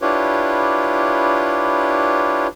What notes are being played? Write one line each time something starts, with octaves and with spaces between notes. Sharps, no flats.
D4 E4 F4 G4 B4 C#5